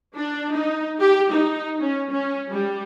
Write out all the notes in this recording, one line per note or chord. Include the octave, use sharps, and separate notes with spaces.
D4
D#4
G4
D#4
C#4
C#4
G3